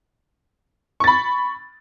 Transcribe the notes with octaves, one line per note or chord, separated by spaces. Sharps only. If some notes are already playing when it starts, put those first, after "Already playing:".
B5 C#6 A6